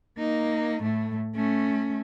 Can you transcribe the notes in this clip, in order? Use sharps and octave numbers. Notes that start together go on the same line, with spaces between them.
A#3 D#4
A2 A3
A3 C#4